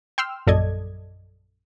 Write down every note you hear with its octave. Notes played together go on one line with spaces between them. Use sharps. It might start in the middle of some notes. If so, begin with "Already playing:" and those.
G5 C6 E6 F6
A#1 F#2 A4 D5 D#5 G#6